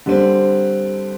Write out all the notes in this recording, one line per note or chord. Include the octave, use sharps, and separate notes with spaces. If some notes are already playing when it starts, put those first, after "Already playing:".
D3 G3 C4